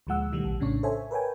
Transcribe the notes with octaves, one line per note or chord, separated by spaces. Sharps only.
D2 A#2 F3 G#3 F#5 E6
B2 D#3 E3 G3 A3
A#1
A#1 A2 C#3 C#4 D4 C#6
A4 C5 C#5 E5 G#5
A#4 B4 C#5 G5 G#5